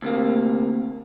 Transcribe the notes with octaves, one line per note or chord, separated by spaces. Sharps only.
D2 C3 A#3